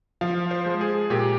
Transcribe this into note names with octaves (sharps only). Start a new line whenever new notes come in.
F3 F5
C5
G#3
G#4
A#2 G4